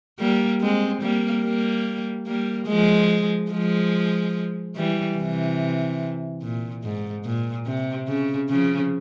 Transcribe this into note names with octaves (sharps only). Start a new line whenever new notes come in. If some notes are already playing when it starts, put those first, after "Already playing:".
G3 A#3
G#3 C4
G3 A#3
G3 A#3
G3 A#3
F3 G#3
F3 G#3
E3 G3
C3 E3
A#2
G#2
A#2
C3
C#3
C#3 F3